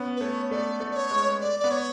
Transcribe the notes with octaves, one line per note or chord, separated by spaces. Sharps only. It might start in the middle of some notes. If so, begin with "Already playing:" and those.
Already playing: B3 C#4
B4
A3 C#5
A3 D5
A3
D5
C#5
G#3
D5
B3 D5
C#5